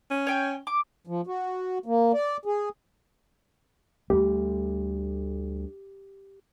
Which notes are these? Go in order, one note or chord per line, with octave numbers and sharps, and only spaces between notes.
C#4
C#5 G5 G#5
D6
F3
F#4
A#3
D5
G#4
D2 G3 A3 G4